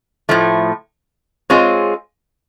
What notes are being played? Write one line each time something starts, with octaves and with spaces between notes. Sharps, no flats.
A2 F3 A3
G#3 C4 F4 G#4 C#5